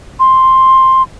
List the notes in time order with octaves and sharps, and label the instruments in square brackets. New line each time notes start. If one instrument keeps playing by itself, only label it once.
[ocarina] C6